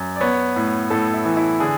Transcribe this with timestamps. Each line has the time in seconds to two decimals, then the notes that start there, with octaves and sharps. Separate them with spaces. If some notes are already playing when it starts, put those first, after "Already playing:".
Already playing: F#2
0.16 D5
0.21 B3 C#5
0.56 A2
0.90 A2 A4
1.14 E4
1.25 E3
1.37 E4
1.60 D3 G#4